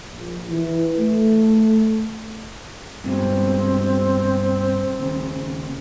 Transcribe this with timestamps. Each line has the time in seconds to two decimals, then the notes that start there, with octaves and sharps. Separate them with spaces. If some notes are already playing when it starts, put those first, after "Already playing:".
0.11 A#1
0.48 E3
0.99 A3
3.04 G2 B2 G#3 C4
4.99 D#2 C#3